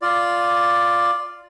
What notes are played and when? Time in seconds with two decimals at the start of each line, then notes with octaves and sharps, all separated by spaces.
0.02 F4 D5